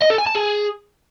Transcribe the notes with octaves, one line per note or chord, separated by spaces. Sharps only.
D#5
A4
G#5
A5
G#4